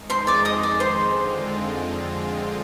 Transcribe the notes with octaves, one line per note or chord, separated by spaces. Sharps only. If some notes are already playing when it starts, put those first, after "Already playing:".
Already playing: F2 D#3 G#3 D#4
C5 C6
D5 D6
D#5 D#6
D5 D6
C5 C6
F2 D3 G#3 C4 F4